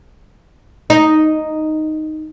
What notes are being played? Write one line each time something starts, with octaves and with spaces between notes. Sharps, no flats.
D#4